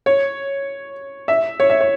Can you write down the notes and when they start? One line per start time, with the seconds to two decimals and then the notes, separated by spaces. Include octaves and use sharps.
0.06 C#5
1.28 E5
1.60 C#5
1.70 E5
1.81 C#5